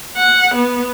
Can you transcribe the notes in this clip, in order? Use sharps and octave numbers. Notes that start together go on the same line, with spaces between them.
F#5
B3